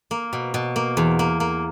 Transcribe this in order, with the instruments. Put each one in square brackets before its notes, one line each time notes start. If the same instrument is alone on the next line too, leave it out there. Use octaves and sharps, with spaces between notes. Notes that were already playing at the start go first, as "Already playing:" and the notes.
[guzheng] A#3
B2
B2
A#3
E2
A#3
A#3